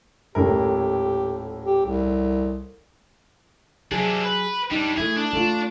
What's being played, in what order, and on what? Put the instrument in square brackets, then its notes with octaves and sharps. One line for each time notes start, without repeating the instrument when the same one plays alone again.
[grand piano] D#1 A2 A#4 [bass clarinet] G4
[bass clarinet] G4
C2
[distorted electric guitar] C3 D4 [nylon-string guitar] F#3 G#4
[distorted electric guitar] B4
[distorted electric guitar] G3 D4 [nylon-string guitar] D#4
[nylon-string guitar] A3 E4 [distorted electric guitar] G#4
[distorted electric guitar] D4
[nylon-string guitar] A3 F4